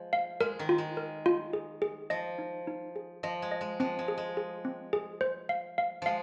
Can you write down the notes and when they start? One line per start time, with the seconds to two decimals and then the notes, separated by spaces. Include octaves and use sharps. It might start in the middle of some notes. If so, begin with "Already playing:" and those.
Already playing: F3 G#3
0.13 F5
0.40 G#3 A#4
0.59 D#3
0.69 F4
0.78 G#3
0.97 A#4
1.26 F4
1.53 G#4
1.82 G#4
2.10 F3 D#5
2.39 D#4
2.67 D#4
2.96 G#4
3.23 F3 D#5
3.42 G#3
3.52 D#5
3.61 G#3
3.80 F3 C4
3.99 G#3
4.08 G#4
4.18 G#3
4.37 G#4
4.65 C4
4.93 G#4
5.21 C5
5.49 F5
5.78 F5
6.02 F3 G#3 F5